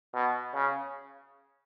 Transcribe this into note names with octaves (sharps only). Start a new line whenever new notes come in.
B2
C#3